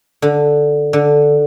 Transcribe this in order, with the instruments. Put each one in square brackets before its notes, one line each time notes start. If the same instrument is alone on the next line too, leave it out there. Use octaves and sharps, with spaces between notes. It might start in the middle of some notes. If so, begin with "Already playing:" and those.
[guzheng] D3
D3